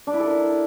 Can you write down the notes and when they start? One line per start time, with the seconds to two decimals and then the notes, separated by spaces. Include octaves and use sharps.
0.07 D4
0.13 E4
0.20 A4
0.26 A#4